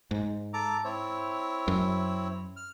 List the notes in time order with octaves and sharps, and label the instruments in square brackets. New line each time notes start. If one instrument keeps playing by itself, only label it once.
[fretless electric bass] G#2
[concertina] A4 A#5 D6
C4 E4 C#5
[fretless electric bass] F#2
[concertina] F6